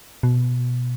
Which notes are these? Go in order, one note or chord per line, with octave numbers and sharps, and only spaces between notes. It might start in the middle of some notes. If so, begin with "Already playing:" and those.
B2